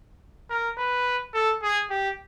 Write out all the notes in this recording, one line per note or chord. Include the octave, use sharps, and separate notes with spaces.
A#4
B4
A4
G#4
G4